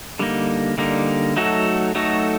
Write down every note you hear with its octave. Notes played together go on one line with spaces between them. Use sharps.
D3 G3 A#3 D#4
D3 G3 A#3 D#4
F#3 A3 D#4 F#4 A4
F#3 A3 D#4 F#4 A4